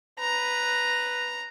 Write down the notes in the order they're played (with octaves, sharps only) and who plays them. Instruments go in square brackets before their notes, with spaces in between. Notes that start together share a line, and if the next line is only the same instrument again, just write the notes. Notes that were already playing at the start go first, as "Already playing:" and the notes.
[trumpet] B4 [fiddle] A#5